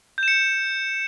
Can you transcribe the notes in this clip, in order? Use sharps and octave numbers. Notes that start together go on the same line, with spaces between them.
G6 C#7 E7